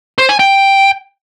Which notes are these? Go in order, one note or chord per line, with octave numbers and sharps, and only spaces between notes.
C5
G#5
G5